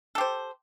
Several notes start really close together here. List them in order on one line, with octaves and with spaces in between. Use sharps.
A4 G4 C5